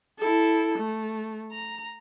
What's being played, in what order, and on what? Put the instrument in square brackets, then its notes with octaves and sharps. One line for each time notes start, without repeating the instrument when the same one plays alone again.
[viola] E4 A4
A3
A#5